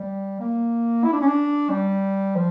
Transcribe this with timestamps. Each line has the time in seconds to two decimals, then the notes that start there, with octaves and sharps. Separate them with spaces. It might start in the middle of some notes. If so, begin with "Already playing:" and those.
Already playing: G3
0.40 A#3
1.04 E4
1.12 D4
1.21 C#4
1.27 D4
1.70 G3
2.36 F3